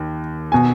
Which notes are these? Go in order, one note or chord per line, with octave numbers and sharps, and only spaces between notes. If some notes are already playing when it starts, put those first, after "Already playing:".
Already playing: D#2
B2 G#5